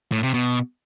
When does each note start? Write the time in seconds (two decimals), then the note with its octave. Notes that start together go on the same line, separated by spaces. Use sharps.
0.12 A2
0.23 C3
0.34 B2